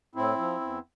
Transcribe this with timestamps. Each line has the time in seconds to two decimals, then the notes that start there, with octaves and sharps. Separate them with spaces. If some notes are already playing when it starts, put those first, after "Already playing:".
0.15 A2 C4 E4
0.38 F3
0.61 E2